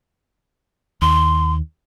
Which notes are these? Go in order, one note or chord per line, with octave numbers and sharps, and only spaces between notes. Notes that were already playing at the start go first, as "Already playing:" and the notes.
D#2 C6